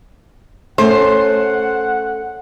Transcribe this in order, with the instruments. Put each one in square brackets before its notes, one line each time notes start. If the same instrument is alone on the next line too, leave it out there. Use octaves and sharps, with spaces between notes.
[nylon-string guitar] A3 C#4 [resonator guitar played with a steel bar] C5 [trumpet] F#5